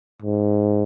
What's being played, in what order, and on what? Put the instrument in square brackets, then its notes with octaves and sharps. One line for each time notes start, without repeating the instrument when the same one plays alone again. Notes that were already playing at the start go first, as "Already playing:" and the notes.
[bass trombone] G#2